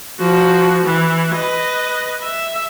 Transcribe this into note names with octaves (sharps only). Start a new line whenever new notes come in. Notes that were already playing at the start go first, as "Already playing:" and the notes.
F3 F#4
E3
B4 D#5
E5